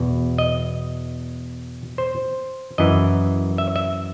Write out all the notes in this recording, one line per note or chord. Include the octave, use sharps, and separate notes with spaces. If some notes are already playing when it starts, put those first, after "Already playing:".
Already playing: E2 B2
D#5
C5
F#2 E3 D#5
E5
E5